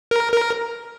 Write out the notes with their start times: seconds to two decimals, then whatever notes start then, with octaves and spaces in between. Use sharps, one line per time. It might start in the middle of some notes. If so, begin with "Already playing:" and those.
0.11 A#4
0.33 A#4